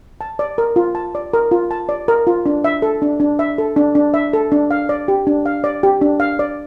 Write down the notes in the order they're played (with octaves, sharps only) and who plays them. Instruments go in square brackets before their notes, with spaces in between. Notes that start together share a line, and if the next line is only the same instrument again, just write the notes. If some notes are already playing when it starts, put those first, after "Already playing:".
[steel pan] A5
D5
A#4
F4
A5
D5
A#4
F4
A5
D5
A#4
F4
D4
E5
A4
D4
D4
E5
A4
D4
D4
E5
A4
D4
F5
D5
G4
D4
F5
D5
G4
D4
F5
D5